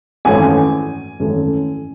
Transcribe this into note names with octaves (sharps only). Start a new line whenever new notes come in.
G#1 F#2 E3 A3 C#4 G#5
G#1 F#2 E3 A3 C#4